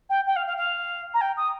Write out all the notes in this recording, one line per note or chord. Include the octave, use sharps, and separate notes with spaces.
G5
G5
F5
F5
F5
A#5
G5
D#6